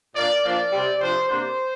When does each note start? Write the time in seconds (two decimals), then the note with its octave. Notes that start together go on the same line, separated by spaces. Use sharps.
0.14 A#2 A#3 D4 D5
0.42 F3 A#3 D4 D5
0.71 C3 G3 C4
0.99 C3 F3 D4 C5
1.28 C3 A#3 D4 C5